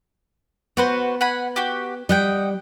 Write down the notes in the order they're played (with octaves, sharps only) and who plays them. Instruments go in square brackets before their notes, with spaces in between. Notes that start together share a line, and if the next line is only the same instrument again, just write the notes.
[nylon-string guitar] B3 [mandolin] F#4 B4 C5
[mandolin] F#5 G#5 B5
F#4 G4
[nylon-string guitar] G3 [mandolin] D#5 F#5 G5